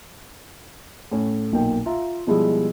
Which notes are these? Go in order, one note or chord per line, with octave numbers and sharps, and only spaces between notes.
A2 C#4
B1 A#2 A#3 G5
F4 E5 A#5
B2 F3 G3 G#3 E4 G#4